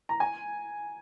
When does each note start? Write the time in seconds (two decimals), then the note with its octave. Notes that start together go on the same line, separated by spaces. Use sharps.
0.09 A#5
0.20 G#5